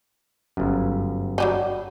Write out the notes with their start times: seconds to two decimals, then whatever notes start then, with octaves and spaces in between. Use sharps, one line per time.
0.57 G1 F#2
1.38 F#3 G3 D#4